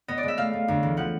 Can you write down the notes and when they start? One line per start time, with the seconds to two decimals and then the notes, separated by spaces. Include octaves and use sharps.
0.08 B3 D#5
0.18 D5
0.23 G#3
0.28 E5
0.38 A3 F5
0.53 A3
0.68 D2
0.83 E3
0.97 F3 F#5